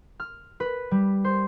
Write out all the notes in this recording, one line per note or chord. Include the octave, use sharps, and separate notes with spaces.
F6
B4
G3
C5